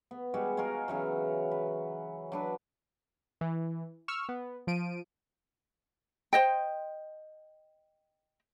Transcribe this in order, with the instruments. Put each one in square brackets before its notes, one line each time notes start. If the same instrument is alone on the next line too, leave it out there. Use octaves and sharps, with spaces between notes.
[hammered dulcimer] B3
G3 G#3 F#4
G#3 F4 F#4 A#4
C#3 E3 F#3
B4
F#3 D4 B4
[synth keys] E3
C#6 E6 F6
B3
F3 D7 D#7
[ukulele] C5 D#5 G5